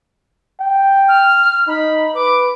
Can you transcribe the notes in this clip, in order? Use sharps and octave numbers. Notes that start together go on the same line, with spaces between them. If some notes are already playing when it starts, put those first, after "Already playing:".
G5
F6
D#4 B5
B4 D6